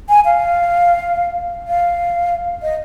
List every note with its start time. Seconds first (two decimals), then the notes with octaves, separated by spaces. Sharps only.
0.09 G#5
0.25 F5
1.68 F5
2.63 D#5